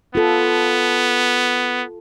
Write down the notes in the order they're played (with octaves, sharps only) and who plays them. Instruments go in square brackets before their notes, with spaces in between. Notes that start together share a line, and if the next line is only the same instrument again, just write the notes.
[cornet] B3 [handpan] F4 A4